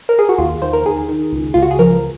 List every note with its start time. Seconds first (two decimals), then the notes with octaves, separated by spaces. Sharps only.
0.09 A#4
0.19 G#4
0.29 F#4
0.38 D#2 F4
0.62 D#3 C5
0.73 A#4
0.85 D#3 G#4
1.09 D#3
1.33 C#2
1.54 C#2 F4
1.62 F#4
1.71 G#4
1.79 F3 A#4